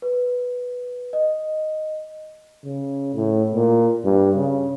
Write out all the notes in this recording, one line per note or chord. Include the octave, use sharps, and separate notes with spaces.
B4
D#5
C#3
A2
A#2
G2
C#3